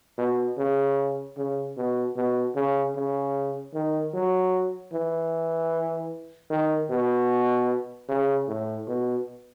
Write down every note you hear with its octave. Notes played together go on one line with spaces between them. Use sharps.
B2
C#3
C#3
B2
B2
C#3
C#3
D#3
F#3
E3
D#3
B2
C#3
A2
B2